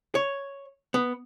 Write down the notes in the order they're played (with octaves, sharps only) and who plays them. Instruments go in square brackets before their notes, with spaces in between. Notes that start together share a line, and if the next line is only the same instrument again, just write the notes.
[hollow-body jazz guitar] C#5
B3